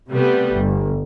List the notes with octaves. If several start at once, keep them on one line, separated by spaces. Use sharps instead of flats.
C3 G3 A3 B3
G1